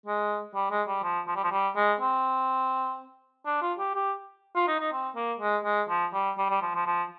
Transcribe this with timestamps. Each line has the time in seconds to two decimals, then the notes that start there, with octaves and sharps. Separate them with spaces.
0.06 G#3
0.55 G3
0.71 G#3
0.88 G3
1.03 F3
1.27 F3
1.36 G3
1.43 F3
1.52 G3
1.76 G#3
2.01 C4
3.46 D4
3.62 F4
3.79 G4
3.95 G4
4.55 F4
4.68 D#4
4.80 D#4
4.93 C4
5.16 A#3
5.40 G#3
5.64 G#3
5.89 F3
6.14 G3
6.38 G3
6.50 G3
6.62 F3
6.75 F3
6.86 F3